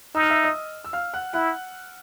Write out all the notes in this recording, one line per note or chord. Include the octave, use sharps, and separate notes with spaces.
D#4 E6
F6
E5 E6
D#5 D#6
E6
F5 F6
F#5 F#6
E4 F#5 F#6